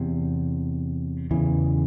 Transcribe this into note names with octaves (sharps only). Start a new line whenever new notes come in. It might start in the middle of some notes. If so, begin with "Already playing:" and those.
Already playing: E2 C3
E2 C#3 E3